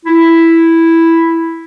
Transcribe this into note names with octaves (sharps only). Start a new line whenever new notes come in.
E4